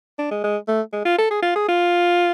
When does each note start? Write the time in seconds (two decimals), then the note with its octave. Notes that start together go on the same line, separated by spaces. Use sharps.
0.19 D4
0.31 G#3
0.44 G#3
0.68 A3
0.93 G#3
1.05 F4
1.18 A4
1.30 G#4
1.43 F4
1.56 G#4
1.69 F4